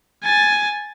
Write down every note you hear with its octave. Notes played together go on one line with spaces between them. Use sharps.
G#5 A6